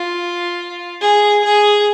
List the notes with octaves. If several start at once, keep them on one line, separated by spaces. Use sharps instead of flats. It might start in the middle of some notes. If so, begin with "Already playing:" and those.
Already playing: F4
G#4
G#4